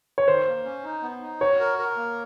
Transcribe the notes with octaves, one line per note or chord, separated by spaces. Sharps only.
C#5
D#3 C5
A#3
C#4
D#4
B3
D#4
F#4 C#5
A#4
A#4
A#3